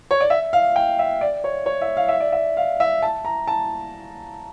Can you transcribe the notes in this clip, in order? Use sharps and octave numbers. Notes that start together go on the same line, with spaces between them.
C#5
D5
E5
F5
G5
E5
D5
C#5
C#5
E5
F5
E5
D5
E5
F5
E5
A5
A#5
A5